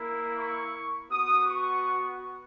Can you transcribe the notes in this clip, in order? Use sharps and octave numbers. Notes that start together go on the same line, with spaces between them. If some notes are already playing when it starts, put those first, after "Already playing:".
Already playing: A#3 E4
C#6
B3 F#4 D#6
C#6